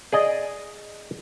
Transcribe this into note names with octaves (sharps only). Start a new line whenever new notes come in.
G#4 D5 D#5